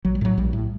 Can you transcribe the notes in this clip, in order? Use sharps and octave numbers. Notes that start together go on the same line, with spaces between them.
A#1 F#3
G3
A2 F#3
A#1 G3
A2